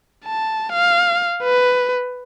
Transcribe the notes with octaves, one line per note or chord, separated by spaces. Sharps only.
A5
F5
B4